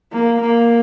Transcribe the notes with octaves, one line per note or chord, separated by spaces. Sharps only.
A#3
A#3